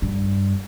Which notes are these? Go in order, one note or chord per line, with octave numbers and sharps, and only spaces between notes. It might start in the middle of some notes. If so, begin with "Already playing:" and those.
G2